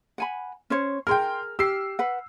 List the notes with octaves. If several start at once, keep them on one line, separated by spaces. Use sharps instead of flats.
F#5 G#5 B5
C#4 C5 C#5
G#4 A#4 G5 C6 F6
G4 E6 C7
B4 F#5